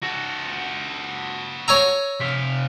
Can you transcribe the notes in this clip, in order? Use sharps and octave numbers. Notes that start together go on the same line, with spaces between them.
F#4 A4 A#6
C#5 G#5 A#5 E6
C3 F5 B6